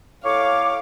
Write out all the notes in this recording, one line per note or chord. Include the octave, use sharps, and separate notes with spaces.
A2 C#5 F5 C#6 D6